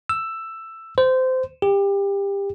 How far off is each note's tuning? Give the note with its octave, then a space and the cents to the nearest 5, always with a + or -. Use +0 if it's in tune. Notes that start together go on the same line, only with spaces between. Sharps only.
E6 +10
C5 -20
G4 +25